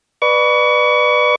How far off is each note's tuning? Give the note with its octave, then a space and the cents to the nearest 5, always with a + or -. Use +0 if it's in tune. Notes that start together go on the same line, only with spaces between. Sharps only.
B4 -5 D5 +30 C#6 +35